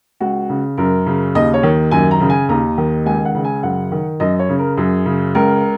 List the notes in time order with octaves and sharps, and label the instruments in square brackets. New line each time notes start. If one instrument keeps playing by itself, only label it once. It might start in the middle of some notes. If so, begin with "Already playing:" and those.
[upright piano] C#2 F#4
C#3
F#2 A#4
C#3
D#2 D#5
C#5
D#3
F#2 G#5
A#5
C#3
G#5
D#2 A#5
D#3
C#2 G#5
F#5
C#3
G#5
F#2 F#5
D#3
F#2 D#5
C#5
C#3
A#4
F#2 G#4
C#3
C#2 A#4